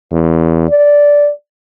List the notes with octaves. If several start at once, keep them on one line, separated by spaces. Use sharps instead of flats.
E2
D5